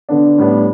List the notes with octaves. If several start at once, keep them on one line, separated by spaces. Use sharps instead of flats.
D3 B3 D4
A2 G3 B3 D4